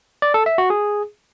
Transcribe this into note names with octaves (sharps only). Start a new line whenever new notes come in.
D5
A4
E5
F#4
G#4